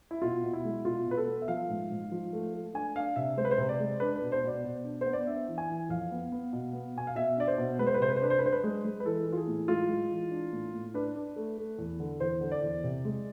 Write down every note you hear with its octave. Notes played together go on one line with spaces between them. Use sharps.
E4
B2 F4
B2
E4
G#3
B2 F4
B2 B4
A4
B3
E5
F3 F5
G#2
G#2
F3
A3
A3
D4 G#5
D4 F5
C3 E5
G#3 C5
B4
C5
C3
D5
G#3
D4 B4
B4
B2
C5
B2 D5
B2
D4
B3 C5
D5
D4 E5
E3
G#5
E3
F2 F5
B3
B3
B2
B3
B2 G#5
F5
B2 E5
D4 D5
C5
B2
G#3 B4
C5
B4
C3 C5
B4
C5
D4 B4
C5
B4
D4 C5
B4
G#3
G#3
B4
E3 A4
E3
F4
G#4
A2
G#3 F4
G#3
E3
D4
A2
A2
D4 B4
D4
A3
A3
E2
D3
E2 C5
D3
D5
E2
C3
G#3